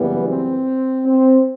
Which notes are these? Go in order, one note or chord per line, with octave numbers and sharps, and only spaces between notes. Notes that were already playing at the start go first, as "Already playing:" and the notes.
Already playing: F#1 F#2 E3 G3 B3
C4
C4